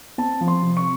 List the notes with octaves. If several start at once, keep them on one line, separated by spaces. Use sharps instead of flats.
C4 A5
F3
C6
C3
C#6